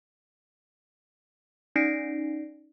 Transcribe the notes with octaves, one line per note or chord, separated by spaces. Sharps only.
C#4 D#4 D5 A#6 C7 D7